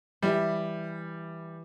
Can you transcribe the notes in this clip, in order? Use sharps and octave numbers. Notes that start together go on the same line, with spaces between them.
E3 G3 E5